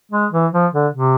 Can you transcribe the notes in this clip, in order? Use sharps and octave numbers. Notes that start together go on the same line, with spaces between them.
G#3
E3
F3
D3
C3